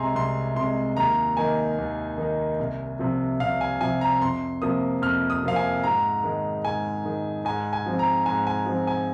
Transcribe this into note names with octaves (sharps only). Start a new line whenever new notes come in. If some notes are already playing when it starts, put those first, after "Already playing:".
Already playing: C2 C3 G#3 G#5 A#5 C6
C2 C6
C3 G#3 C6
D#2 A#5
D#3 A#3 D#4 G#5
D#2
D#3 A#3 D#4
C2
C3 F3
C2 F5
G#5
C3 F3 G#5
A#5
F2 C6
C3 F3 A#3 D#6
F2 F6
D#6
C3 F3 A#3 F5
G#5
G#2 A#5
D#3 G#3
G#2 G#5
D#3 G#3
G#2 G#5
G#5
F3 C4
A#5
G#2 G#5
G#5
F3 C4
G#5